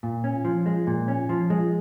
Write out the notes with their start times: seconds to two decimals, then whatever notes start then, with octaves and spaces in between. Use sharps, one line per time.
0.03 A#2
0.24 C#4
0.45 F3
0.66 G#3
0.87 A#2
1.08 C#4
1.29 F3
1.50 G#3